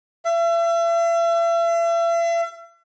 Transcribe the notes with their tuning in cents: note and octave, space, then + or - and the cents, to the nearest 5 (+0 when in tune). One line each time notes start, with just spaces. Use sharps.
E5 +40